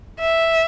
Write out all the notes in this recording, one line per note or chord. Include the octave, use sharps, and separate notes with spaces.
E5